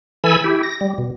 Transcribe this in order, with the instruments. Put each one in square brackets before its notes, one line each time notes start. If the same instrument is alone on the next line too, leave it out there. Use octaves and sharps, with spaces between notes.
[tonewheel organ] E3 A4 G#5 B5 E6
E4 G4
A#6
G3
B2